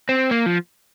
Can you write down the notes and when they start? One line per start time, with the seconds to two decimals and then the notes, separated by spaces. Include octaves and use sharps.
0.09 C4
0.31 A#3
0.46 F3